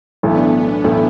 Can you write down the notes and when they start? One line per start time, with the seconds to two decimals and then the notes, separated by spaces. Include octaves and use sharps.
0.23 B1 A2 E3 A3 B3 D4
0.54 B3 D4
0.84 B1 A2 E3 A3